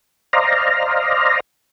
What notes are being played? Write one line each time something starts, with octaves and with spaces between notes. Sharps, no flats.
C5 D5 D#5 F5 A#5